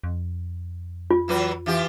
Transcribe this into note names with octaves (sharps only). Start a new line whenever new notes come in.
F2
F4
E3 F#3 B4
E3 F4 G4